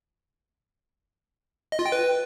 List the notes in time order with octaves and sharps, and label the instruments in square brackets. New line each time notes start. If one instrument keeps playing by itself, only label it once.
[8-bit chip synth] D#5
F4
G5
B4